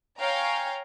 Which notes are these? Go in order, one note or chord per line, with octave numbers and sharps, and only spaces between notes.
C#5 F5 G5 G#5 A#5